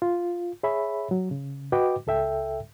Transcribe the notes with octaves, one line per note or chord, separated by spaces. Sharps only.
F4
G#4 C#5 E5 B5
F#3
C#3
F#4 B4 D#5 G5 D6
C#2 A4 E5 G5